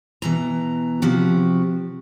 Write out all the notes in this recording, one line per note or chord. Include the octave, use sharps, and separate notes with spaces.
B2 E3 A#5
C3 F3 F#4 G4